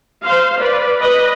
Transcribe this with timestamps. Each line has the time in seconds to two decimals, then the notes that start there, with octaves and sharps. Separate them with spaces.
0.23 C5 F5
0.60 B4 D5
1.01 B4 D#5